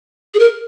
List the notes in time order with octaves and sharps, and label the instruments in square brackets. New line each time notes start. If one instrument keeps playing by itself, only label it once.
[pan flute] G#4
A#4